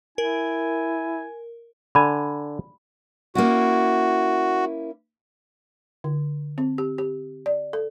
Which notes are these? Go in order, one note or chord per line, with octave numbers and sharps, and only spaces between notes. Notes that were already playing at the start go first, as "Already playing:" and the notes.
E4 A#4 G#5
D3 G#5 B5
A#3 C#4 E4 F#4
D3
C4
G4
G4
D5
A4